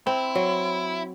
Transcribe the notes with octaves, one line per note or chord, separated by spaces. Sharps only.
C4 E4
F#3